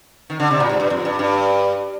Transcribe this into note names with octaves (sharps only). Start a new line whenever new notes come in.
D#3
D3
C3
A#2
G#2
G2
F2
G2
G2